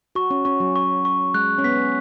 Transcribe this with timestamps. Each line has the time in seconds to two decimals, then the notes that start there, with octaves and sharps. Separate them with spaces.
0.15 F#4 C#6
0.30 C#4
0.45 C#4 C#6
0.60 F#3
0.76 C#6
1.05 C#6
1.34 G#3 F#6
1.58 C#4
1.64 B3 B6